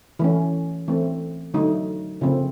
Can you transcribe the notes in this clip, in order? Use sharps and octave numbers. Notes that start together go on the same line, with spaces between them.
E3 A3 C#4
E3 A3 C4
D3 F#3 A3 D#4
C#3 F3 A3 C4